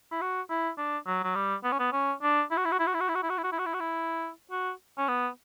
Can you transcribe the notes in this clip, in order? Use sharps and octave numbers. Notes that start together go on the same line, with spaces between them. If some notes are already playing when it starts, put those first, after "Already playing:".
E4
F#4
E4
D4
F#3
F#3
G3
B3
C#4
B3
C#4
D4
E4
F#4
E4
F#4
E4
F#4
E4
F#4
E4
F#4
E4
F#4
E4
F#4
E4
F#4
E4
F#4
E4
F#4
C#4
B3